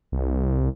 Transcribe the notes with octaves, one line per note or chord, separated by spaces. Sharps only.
C2